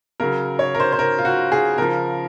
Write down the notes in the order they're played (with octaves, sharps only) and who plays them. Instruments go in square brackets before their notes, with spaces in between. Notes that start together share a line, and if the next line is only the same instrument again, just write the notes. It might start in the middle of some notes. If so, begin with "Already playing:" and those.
[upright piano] C#3 F#3 A#4
C#5
A#4
C5
C5
A#4
F4
F#4
G#4
C#3 F3 A#4